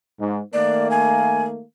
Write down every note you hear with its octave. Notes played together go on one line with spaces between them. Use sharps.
G#2
D#3 A3 A#3 D5
G#5